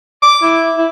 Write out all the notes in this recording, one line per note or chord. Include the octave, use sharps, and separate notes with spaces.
D6
E4
E4